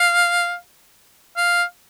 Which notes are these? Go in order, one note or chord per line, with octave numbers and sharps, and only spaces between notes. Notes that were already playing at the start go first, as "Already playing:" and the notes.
Already playing: F5
F5